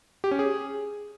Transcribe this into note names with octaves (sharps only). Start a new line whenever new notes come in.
G4
C#4
G#4